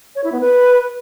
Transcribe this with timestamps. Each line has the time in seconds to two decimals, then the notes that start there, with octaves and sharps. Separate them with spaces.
0.15 C#5
0.24 E4
0.32 B3
0.40 B4